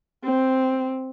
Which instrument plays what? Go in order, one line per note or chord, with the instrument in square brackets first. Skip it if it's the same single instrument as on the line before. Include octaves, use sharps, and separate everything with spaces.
[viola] C4